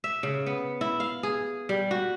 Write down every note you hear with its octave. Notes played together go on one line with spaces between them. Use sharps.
E5
C#3
B3
E4
F5
G#4
G3
F#4